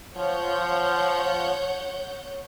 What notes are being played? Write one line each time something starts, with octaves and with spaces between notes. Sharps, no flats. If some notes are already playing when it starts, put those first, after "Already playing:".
F3 C#5 F#5 G6